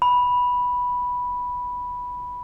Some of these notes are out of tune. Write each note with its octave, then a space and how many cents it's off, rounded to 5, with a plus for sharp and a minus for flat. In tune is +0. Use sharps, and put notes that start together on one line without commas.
B5 -5